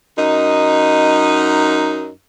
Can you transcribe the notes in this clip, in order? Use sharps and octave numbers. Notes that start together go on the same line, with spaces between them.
F#2 D#4